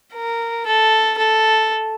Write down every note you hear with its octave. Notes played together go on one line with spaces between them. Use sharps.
A#4
A4
A4